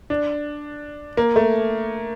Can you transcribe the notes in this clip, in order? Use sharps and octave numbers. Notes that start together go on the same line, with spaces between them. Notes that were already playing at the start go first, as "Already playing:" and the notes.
D4
A#3
A3